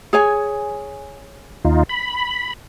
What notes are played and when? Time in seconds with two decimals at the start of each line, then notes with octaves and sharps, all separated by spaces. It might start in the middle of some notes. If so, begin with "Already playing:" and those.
0.13 G#4 C#5 G#5
1.65 D#2 D#4 F4
1.89 B5